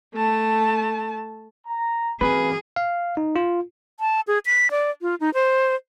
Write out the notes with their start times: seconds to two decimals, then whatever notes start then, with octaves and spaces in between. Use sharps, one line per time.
0.15 A3 A5
1.67 A#5
2.21 F#1 E3 F#3 A#3 C4 G#4 B4
2.76 F5
3.17 D#4
3.36 F4
4.00 A5
4.28 G#4
4.46 B6
4.71 D5
5.02 F4
5.20 D#4
5.34 C5